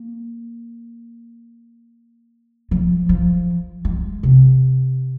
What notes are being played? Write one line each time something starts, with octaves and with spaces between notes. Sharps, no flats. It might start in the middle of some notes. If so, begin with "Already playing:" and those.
Already playing: A#3
F3
F3
G#3
C3